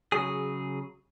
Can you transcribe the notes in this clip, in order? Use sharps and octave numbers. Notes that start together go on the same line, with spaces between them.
C#3 F#3 G#4